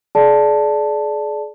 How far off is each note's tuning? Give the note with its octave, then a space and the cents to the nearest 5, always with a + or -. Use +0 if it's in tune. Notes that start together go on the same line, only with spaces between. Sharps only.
G#4 +35 D5 +0 A5 +0